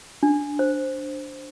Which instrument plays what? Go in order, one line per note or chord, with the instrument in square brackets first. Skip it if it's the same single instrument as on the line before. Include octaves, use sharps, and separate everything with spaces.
[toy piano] D4
C5